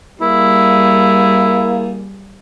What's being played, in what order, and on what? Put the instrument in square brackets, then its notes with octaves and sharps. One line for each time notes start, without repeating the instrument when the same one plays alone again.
[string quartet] G3 G#4 [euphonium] A#3 [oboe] E4